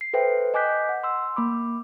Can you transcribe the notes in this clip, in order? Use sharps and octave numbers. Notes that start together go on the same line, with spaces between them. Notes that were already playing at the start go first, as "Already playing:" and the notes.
C7
A4 B4 C5 E5 G5
D#5 G#5 D6 F#6 G6 B6
F#5
C6 E6
A#3 B5 D6